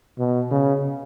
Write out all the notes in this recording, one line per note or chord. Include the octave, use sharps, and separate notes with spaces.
B2
C#3